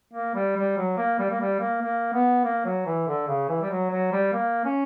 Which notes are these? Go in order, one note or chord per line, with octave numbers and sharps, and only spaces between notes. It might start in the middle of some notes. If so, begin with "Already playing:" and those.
A#3
G3
G3
F#3
A#3
G3
A#3
G3
A#3
A#3
B3
A#3
F#3
E3
D3
C#3
E3
G3
F#3
F#3
G3
A#3
C#4